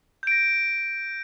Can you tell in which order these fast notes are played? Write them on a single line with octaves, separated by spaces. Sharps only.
G6 D7 A#6